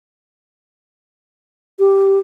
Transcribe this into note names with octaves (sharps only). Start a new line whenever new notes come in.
G4